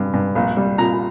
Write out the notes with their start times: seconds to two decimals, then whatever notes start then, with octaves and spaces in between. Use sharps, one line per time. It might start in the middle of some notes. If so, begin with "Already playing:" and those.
Already playing: G2
0.14 G2
0.35 A#1
0.57 G3
0.78 A#2 A#5